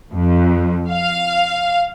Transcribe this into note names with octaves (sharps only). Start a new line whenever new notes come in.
F2
F5